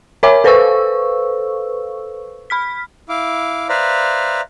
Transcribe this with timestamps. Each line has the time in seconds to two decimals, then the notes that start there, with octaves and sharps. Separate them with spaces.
0.23 A#4 C#5 E5 G#5 B5 D6
0.44 A4 B4 C5 F5 C#6 E6
2.50 B5 F6 B6
3.09 E4 F5 D6
3.69 B4 C5 D5 E5 F5 A#5